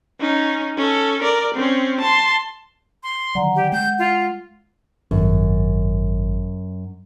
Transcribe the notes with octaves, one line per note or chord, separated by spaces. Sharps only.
C#4 D#4
C#4 A4
A#4 D5
C4 C#4
A5 C6
C6
D3 D#3 F#3 D5 F#5 A#5
G4 F#5 G5
G#3 F#5 G6
F4
G#1 F#2